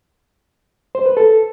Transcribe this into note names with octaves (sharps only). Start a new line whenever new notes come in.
C5
B4
A4